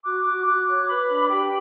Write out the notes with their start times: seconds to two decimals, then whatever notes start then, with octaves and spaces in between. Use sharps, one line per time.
0.04 F#4 D6 F#6
0.25 F#4 D6 F#6
0.47 F#4 D6 F#6
0.67 C#5 D6 F#6
0.89 B4 B5 D6
1.09 D4
1.30 G4 G5 B5